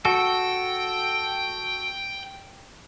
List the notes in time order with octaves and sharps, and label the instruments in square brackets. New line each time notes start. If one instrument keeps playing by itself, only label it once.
[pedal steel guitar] F#4 A4 [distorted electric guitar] G5